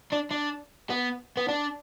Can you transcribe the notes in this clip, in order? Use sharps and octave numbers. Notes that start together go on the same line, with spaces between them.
D4
D4
B3
B3
D4